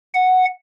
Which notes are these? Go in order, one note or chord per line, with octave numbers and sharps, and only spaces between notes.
F#5